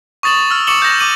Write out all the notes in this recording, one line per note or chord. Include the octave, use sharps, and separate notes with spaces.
C#6 D#6 A6 E7 F#7
E6 F6
C#6 D6 C#7 E7 F#7 G7
G6 A#6
D6 D#7 F#7